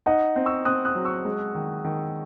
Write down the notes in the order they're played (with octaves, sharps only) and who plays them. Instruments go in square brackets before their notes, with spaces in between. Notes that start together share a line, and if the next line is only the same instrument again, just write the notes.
[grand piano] D#4 [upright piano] D#5 F#5
[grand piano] C4
[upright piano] C#6 E6
[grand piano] C4 [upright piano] D#6 F#6
[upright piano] D#6 F#6
[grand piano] F#3
[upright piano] C#6 E6
[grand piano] G#3
D#3
D#3